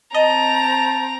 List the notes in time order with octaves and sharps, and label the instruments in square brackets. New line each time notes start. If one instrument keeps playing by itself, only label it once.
[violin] C4 A#5 [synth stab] D#5 [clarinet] A5